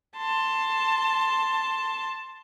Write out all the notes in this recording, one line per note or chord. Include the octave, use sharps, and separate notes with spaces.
A5 C6